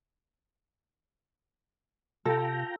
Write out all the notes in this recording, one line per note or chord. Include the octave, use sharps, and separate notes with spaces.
C3 F4 A4 G5 A#5